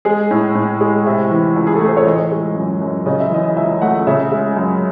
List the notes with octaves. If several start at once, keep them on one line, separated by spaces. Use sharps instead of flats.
G#3 G#4
A2
A2
G#3
C3 E5
E3
C#2
G#4
A4
A3
C5
C#5
E3 D#5
G#3
F#2
F#2
C#3 D#5
E5
E3 D#5
C#2 E5
A3 F#5
C#3 E5
G#3 E5
F#2